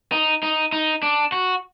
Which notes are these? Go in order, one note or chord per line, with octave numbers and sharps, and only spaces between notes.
D#4
D#4
D#4
D4
F#4